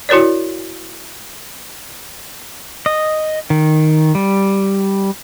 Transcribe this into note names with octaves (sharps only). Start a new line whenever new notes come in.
E4 F#4 A#4 C#5 D5
D#5
D#3
G3